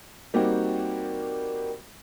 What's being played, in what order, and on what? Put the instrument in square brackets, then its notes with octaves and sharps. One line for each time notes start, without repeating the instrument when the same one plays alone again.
[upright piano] G3 A#3 C4 D#4 F#4 G4